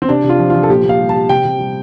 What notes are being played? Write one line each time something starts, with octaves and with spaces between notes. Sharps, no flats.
C4
C3 D4
C3
F4
F3
F3 F4
A4
A#2 G4
A#2 F5
G3
A5
G3
C3 G5
C3
G3